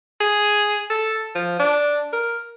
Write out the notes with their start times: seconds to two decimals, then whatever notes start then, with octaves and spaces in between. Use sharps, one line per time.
0.21 G#4
0.90 A4
1.35 F3
1.59 D4
2.13 A#4